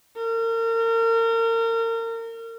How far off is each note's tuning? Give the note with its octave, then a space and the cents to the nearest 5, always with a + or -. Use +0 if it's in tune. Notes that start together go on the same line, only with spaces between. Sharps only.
A#4 -35